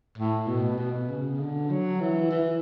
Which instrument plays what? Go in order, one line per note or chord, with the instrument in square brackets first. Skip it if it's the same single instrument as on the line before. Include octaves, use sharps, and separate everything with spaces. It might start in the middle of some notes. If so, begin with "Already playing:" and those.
[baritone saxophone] A2
B2
B2
C#3
D3
F#3
E3
E3